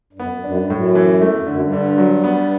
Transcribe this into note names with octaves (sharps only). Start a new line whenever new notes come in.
G2
F#2 B3
F#2
F#2 D4
G2
F#2 A2
E3
E2 A3
F#2
F#2 D3
G2
D3
F#3
B3